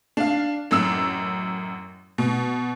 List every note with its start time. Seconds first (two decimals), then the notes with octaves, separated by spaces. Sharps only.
0.17 D4 F5
0.71 A1 F#2 E6
2.18 B2